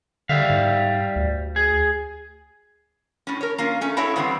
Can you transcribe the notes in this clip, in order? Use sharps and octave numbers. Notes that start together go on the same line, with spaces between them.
D3 G3 E5 F5
G#2
D2
G#4
A2 C#4
A#4 C#5
A#3 C#4 F4
A3 C#4
E4 F#4 A4 C#5 E5
C#3 E3 G3 B3 C4